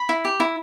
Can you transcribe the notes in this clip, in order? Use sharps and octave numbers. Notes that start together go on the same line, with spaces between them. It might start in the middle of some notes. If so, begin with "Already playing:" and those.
Already playing: B5
E4
G4
E4